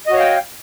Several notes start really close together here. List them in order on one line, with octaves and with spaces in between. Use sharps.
D#5 F#4 C#5 F5 G5